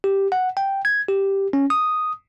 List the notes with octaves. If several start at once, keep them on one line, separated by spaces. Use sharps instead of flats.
G4
F#5
G5
G#6
G4
C#4
D#6